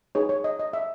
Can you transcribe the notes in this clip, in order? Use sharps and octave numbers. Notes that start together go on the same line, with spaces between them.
D#4 G#4 B4 C#5
C#5
D#5
D#5
E5